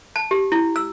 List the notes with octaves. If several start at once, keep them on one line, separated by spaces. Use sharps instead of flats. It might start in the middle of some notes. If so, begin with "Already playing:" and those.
A5
G4
E4
E6